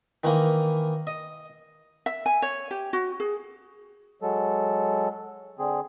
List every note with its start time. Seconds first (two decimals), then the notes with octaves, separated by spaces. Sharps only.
0.24 D#3 E3 A#3
1.07 D#5
2.06 E5
2.26 G#5
2.42 C#5
2.71 G4
2.93 F#4
3.20 G#4
4.22 F#3 G#3 A4
5.59 D3 C4 G#4